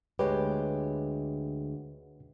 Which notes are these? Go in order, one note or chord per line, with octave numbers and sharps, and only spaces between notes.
D2 G#3 G4 B4 C#5